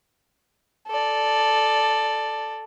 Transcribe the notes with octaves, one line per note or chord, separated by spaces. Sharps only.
A4 D5